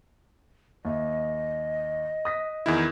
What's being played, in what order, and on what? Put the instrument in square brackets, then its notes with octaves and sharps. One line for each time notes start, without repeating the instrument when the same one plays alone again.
[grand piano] D#2 E5 [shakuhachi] D#5
[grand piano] D#6 A#6 B6
[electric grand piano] E2 D#3 E4